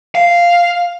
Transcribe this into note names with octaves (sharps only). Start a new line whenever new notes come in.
F5